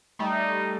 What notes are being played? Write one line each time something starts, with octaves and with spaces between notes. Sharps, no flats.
G3 A3 D#4